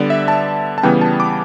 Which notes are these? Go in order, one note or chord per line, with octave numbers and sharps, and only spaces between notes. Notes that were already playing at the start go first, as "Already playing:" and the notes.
Already playing: D3 G3 B3 D5
E5
A5
A5
C#3 E3 G3 B3 G5
A5
D6